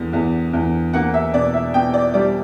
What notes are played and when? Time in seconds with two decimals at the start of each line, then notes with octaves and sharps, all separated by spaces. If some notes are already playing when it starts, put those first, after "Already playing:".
Already playing: E2 D3
0.13 E2
0.53 E2
0.93 A#3 F#5
1.14 E5
1.33 B2 D5
1.54 E5
1.73 B2 G5
1.94 D5
2.14 G3 D5